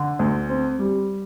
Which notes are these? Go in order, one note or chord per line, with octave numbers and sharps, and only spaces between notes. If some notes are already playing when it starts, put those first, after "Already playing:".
Already playing: D3
D2
C4
G3